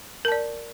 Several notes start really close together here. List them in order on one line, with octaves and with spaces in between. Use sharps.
A#4 A5 D5